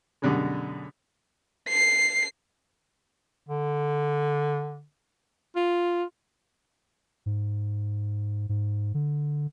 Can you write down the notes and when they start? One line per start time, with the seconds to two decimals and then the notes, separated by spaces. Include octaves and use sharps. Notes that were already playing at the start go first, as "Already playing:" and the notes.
0.22 F#2 B2 D3 G3 G#3
1.68 C7
3.49 D3
5.56 F4
7.26 G#2
8.49 G#2
8.94 D3